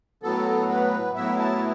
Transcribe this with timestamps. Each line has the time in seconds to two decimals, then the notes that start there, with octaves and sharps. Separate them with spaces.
0.23 A2 F#3 B3 A4
0.69 B4
1.15 A2 F#3 B3 E4 E5
1.39 A5